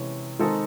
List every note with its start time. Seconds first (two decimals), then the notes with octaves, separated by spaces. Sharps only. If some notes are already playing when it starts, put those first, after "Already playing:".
Already playing: C3 E3 G#3 C#4
0.39 D#3 G#3 C4 D#4 A4